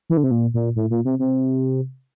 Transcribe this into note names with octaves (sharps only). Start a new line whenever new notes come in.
E3
D3
C3
A#2
A#2
A2
A#2
C3
C3